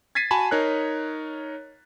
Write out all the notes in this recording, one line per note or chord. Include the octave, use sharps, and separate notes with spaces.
G#6 A6 B6 C7 D#7
F#4 G#5 A5 B5
D#4 A#4 C#5 F#6